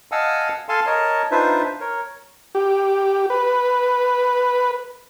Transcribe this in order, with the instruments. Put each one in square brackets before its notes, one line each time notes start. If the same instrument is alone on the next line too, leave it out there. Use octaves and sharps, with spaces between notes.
[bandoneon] D#5 F5 F#5 G#5 A5 E6
A4 F5 G#5 A5 C6
A#4 C#5 D#5 A5
D4 D#4 F4 B4 C5 E5
A#4 C#5
[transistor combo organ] G4
B4